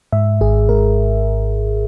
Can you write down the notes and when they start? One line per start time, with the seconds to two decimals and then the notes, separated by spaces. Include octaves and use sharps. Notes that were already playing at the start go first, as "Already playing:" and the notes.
0.12 G#2 E5
0.41 G#1 G#4
0.69 G#2 A#4